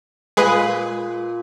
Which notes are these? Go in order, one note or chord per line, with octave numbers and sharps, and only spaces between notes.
A#2 G#3 G#4 B4